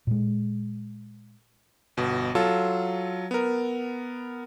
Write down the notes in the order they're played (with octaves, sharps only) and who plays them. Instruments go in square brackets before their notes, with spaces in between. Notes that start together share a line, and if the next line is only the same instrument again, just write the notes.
[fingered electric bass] A#2 G#3
[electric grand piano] G1 B2
F#3 F4 A4 E6
B3 A#4